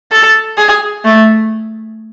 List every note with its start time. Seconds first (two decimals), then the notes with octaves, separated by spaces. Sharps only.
0.12 A4
0.57 G#4
1.04 A3